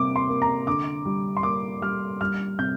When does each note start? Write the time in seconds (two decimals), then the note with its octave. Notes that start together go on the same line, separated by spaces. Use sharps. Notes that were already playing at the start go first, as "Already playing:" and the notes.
Already playing: C3 G3 A#3 D6
0.16 C6
0.29 A#3
0.42 A#5
0.67 D3 D6
1.05 G3
1.37 C6
1.43 A#3 D6
1.82 G3 F6
2.21 G3 F6
2.59 C3 G6